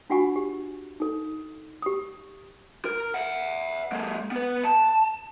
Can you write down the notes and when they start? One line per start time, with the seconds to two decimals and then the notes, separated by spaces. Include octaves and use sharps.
0.10 D4 F4 F#4 F#5 G#5 C#6
0.36 G4
1.00 D#4 A4
1.82 G4 D#6
2.85 A#4
3.14 E5 F#5
3.92 G#3 A#3
4.31 B3 B4
4.64 A5